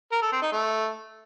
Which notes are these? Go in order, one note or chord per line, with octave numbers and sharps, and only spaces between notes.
A#4
A4
C4
D#4
A3